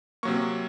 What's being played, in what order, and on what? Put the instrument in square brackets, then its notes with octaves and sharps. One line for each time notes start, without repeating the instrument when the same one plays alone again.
[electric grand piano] C3 F#3 A#3 C#6